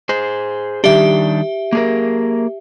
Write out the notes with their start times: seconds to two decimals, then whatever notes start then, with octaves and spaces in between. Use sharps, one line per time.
0.09 G#4 C5
0.84 D#3 G3 D4 G4 E5
1.73 A#3 G#4 A#4